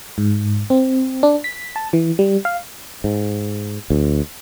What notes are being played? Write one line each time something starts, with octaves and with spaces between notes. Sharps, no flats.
G#2
C4
D4
B6
A5
E3
G3
F5
G#2
D2